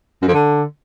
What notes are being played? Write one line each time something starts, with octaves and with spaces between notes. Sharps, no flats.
F#2
F2
D3